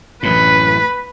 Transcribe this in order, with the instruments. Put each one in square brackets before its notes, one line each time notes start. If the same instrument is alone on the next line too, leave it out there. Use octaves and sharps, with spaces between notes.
[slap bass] A1 F#2 A2 [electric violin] B4 B5